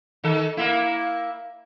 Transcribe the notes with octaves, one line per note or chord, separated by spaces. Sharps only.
D#3 A4
A#3 E4